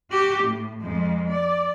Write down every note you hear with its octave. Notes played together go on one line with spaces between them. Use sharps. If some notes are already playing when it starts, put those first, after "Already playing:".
F#4 G4
A2
F2 G#3
D5